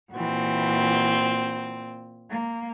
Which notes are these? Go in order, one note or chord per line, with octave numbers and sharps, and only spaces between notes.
A#2 E3 C4 F#4
A#3